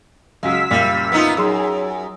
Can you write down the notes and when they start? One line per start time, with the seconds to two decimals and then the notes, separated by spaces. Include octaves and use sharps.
0.43 C#2 F#3 G#3 F5 E6 B6
0.71 F#2 A#2 C#3 G3
1.12 B3 D#4 F4
1.37 F#2 G#4 C6 D#6 E6